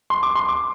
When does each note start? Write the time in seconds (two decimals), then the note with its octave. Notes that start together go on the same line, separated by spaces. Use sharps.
0.10 C6
0.23 D6
0.35 C6
0.49 D6